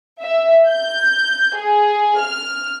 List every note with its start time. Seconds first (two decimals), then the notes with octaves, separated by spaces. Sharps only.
0.20 E5
0.68 G6
1.55 G#4
2.20 F6